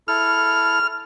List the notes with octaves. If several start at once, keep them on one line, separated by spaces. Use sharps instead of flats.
E4 A4 F6